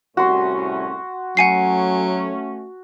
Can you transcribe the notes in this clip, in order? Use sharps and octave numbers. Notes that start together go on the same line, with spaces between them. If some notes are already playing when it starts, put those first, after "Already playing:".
C2 A2 C#4 F#4 C6
F#3 A3 C#4 F#5 G#5 C7